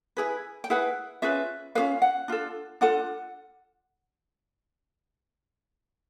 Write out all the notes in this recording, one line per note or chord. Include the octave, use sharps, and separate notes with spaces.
E4 G#4 B4
G5
E4 G#4 B4 F#5
C#4 F4 G#4 B4 E5
C#4 F4 G#4 B4 F5
F#5
D4 F4 A4
D4 F4 A4 F#5